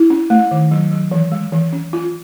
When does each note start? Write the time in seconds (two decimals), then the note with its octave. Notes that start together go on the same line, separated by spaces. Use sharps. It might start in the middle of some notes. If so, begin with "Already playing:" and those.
Already playing: E4
0.10 C#4
0.30 A3
0.51 D#3
0.71 F#3
0.92 F#3
1.11 E3
1.32 G#3
1.52 E3
1.73 C#4
1.93 F4